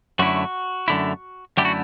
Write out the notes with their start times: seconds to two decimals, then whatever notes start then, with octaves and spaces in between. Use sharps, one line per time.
0.19 F#2 D3 A3 E4 F#4
0.88 F#2 D3 A3 E4
1.57 F#2 D3 A3 E4 G4
1.65 F#4